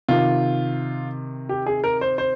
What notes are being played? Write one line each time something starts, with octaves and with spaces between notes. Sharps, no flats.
C3 D#3 F4
G4
G#4
A#4
C5
C5